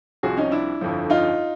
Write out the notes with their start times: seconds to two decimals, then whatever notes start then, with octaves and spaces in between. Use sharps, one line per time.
0.23 C2 C3 F3 F#4 G#4
0.37 C#4 D#4
0.51 D4 E4
0.81 G1 F2 D3 F3
1.10 D#4 F4